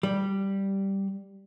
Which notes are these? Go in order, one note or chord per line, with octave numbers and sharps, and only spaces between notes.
G3